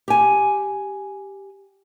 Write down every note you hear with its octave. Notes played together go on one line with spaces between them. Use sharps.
G4 G#5